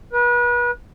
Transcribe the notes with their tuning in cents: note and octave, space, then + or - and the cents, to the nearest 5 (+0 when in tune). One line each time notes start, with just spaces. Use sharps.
B4 -35